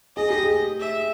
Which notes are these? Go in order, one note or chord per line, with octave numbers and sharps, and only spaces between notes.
G#4 D#5
G4
G#4
E5